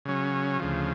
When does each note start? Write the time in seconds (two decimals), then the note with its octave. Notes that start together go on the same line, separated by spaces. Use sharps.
0.05 C#3 F#3 C#4
0.59 D2 C#3 F3